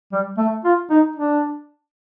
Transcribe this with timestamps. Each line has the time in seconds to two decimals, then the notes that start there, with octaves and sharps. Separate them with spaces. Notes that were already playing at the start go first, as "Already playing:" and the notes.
0.12 G3
0.38 A3
0.64 F4
0.90 D#4
1.16 D4